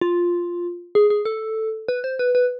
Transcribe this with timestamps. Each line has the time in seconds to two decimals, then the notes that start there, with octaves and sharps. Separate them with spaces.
0.01 F4
0.95 G#4
1.10 G#4
1.25 A4
1.88 B4
2.04 C5
2.19 B4
2.35 B4